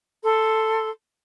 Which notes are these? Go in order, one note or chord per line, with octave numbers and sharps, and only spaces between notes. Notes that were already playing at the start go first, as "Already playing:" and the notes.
A4 C6